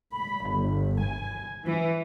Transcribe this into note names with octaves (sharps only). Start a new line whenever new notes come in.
B5
G1
G#5
E3